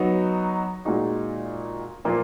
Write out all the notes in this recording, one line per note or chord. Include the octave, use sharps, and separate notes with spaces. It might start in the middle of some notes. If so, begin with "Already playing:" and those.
Already playing: F#3 B3 D#4 F#4
A#2 G#3 D#4 F#4
A#2 F3 A#3 F4